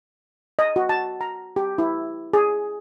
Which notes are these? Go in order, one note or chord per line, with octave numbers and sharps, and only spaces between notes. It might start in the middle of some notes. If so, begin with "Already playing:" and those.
D#5
F#4
A5
A#5
G4
E4
G#4